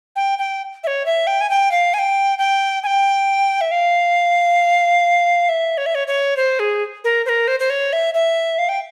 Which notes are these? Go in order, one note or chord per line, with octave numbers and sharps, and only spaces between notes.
G5
G5
E5
C#5
E5
G5
G#5
G5
F5
G#5
G5
G5
G#5
G5
E5
F5
E5
C#5
E5
C#5
C#5
C5
G#4
A#4
C5
A#4
C5
C5
C#5
E5
E5
F5
G5